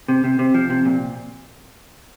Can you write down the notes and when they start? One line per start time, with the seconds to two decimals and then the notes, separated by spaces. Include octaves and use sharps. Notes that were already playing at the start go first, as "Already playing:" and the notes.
0.08 C3
0.24 C3
0.39 C3
0.54 F3
0.70 C3
0.85 A#2